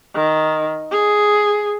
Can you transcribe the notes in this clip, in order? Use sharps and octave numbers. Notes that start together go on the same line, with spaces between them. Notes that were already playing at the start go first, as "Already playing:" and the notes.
D#3
G#4